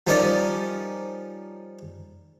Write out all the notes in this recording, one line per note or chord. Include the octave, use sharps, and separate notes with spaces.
F3 G3 C#4 D#4 A#4 D5